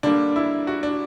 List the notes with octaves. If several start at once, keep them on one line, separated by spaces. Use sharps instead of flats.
D3 G3 A#3 D4
E4
F#4
D4